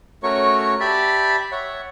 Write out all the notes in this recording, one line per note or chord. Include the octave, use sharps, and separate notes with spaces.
A3 C#4 F#4 A#4 C#5 C#6
G4 D5 E5 A5 B5
C#5 E5 F#5